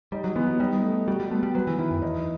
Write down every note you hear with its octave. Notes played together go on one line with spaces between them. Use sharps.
G3 D#4
F#3
E3 B3
F#3
G3 D#4
A3
G3 F#4
G3
A3 B3
G3
F#3 B4
E3
D#3 E4
F#2
E2 D#4